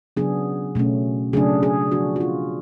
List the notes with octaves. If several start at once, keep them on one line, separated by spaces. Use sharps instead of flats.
C#3 F#3 B3 D4 G#4
B2 A3 C#4
C#3 F#3 A3 D4 G#4
G#4
F3 B3 D4 F#4
F#4
F4